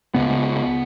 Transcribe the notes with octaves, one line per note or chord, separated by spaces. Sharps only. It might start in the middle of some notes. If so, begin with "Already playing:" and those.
C#2 C#3 B3